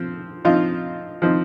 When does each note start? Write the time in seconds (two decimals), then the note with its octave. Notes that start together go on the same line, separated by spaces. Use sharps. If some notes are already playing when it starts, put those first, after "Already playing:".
Already playing: F3 C4
0.45 F3 C4 D#4 F4
1.22 F3 C4 D#4